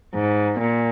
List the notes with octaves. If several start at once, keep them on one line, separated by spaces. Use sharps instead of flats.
G#2
A#2